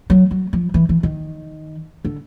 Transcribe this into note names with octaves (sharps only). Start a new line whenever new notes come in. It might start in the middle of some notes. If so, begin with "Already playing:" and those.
F#3
F#3
F3
E3
E3
D#3
D3